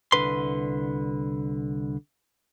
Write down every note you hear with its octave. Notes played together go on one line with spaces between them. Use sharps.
C2 D3 B4 C6